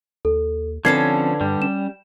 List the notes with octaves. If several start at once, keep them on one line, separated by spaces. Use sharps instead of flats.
D#2 A4
D3 F3 C4 C#4 B4 A5 G#6 C7
G2 G3
C#4 E7